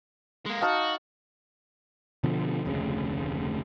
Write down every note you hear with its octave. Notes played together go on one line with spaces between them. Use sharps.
G#3 A#3
D#4 F#4 F5 A5
B2 D3 F3
F1 D2 C#3